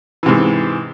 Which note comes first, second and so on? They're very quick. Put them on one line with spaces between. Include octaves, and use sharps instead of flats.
E3 C3 G#2